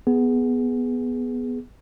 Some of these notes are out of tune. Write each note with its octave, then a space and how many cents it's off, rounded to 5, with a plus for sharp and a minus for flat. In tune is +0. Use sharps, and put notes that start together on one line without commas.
B3 +0 G#4 +0